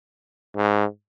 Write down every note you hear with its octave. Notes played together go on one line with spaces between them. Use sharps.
G#2